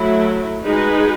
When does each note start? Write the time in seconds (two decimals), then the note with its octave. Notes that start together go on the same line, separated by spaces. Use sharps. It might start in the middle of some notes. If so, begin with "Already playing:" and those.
Already playing: F#3 A3 E4
0.63 G#3 D#4 F#4 B4